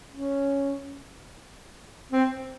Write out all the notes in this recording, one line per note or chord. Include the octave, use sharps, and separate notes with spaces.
C#4
C4